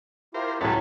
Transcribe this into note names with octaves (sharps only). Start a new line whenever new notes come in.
E4 F4 G4 A#4 C5
C#2 A2 F#3 A3 C#4 B4 C#5 A5